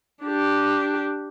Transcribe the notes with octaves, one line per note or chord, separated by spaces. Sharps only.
D4 G4